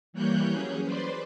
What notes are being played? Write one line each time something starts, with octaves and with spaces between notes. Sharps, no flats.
E3 G3 A#3 C#5 F#6 G6
F#3 C#4 G#4
B4 C5 D5 C6